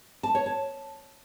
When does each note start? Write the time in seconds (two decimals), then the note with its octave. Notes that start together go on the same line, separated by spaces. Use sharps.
0.23 A5
0.35 C#5
0.46 A5